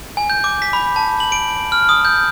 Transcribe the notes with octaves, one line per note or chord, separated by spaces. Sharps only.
G#5
G6
D6
B6
B5
A5
F#7
D7
F6
D#6
G6